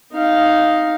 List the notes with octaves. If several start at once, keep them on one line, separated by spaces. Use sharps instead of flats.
D#4 F5